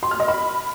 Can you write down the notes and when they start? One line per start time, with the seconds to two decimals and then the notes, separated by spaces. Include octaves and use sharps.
0.03 C6
0.11 F6
0.20 D#5
0.28 B5